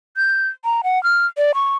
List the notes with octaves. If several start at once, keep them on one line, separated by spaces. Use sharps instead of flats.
G6
A#5
F#5
F6
D5
C#6